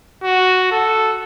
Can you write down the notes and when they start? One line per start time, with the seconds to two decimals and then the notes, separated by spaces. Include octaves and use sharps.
0.24 F#4
0.72 A4